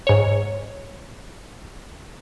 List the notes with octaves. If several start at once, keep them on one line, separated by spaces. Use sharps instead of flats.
G#2 C#5